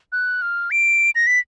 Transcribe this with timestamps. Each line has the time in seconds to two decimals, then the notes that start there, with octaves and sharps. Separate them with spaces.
0.12 F#6
0.42 F6
0.71 D7
1.15 A#6
1.27 B6